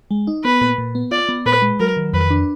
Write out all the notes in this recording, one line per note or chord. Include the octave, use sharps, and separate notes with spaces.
G#3
D#4
B3 B4
A#2
A#2
B3
F4 D5
B3
A#2 B4
G#3
F#3 A#4
D#3
F2 B4
D4